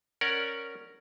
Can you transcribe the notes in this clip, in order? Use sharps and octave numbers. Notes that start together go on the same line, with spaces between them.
C#4 A#4 D5 F#5